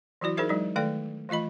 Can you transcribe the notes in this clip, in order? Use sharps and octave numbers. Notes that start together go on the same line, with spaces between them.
E3 F#3 E4 F#4 D5
D#4 G#4 A#4 C5 E5
F#3 G#3 D4 D#4
D#3 A3 A4 D5 G5
E3 A3 F4 D#5 B5